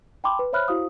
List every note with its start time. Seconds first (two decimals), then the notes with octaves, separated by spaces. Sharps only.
0.24 G5 A5 B5 C6 D6
0.39 B4
0.53 C5 C#5 E5 B5 F6 F#6
0.68 E4 F#4 C5 F5 D#6